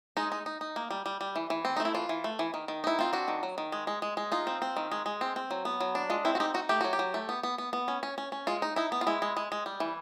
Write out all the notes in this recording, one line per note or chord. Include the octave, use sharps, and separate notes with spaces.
G#3 D#4
D#4
D#4
D#4
A#3
G3
G3
G3
E3
E3
C4
D#4
A3
E4
E3 F4
E3
A3
E3
D#3
D#3
D#4 E4
C4 F4
D4 F#4
D#3
F#3
D#3
G#3
G#3
G#3
G#3
D#4 F4
C4
C4
D#3
G#3
G#3
C4
C4
F#3
B3
F#3
D4
G#3 F4
C4 E4
F#4
D#4 G4
D#4 F#4
A3 G4
F#3 F#4
G4
F#3
A3
B3
B3
B3
B3
C#4
C#4
C#4
C#4
G#3 F4
D#4
D#4 E4
B3
F4
G#3 E4
G#3
G#3
G#3
G3
E3